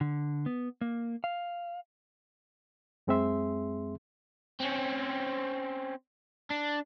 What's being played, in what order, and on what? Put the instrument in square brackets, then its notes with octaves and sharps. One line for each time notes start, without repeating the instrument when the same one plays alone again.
[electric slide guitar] D3
B3
A#3
F5
[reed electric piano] F#2 G#3 C4 G#4 E5 C6
[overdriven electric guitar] C4 C#4
D4